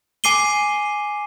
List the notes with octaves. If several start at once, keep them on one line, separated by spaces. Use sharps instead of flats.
G#5 D6 C7 D#7 G7